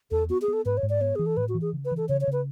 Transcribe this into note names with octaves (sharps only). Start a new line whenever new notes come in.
E2 A4
B3 F#4
G#4
B3
A4
G#2 B4
C#5
G#2
D5
B3 C#5
E3 G#4
A4
A2 B4
F#4
E3
G#4
C#3
B4
E3
A4
C#3 C#5
C#5
C#3 B4